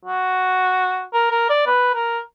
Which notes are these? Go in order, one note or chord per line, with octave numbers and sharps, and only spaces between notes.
F#4
A#4
A#4
D5
B4
A#4